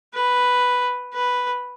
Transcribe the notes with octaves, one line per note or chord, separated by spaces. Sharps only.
B4
B4